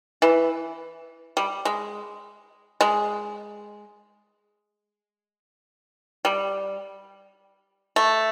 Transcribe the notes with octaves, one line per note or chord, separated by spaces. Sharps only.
E3
G3
G#3
G#3
G3
A3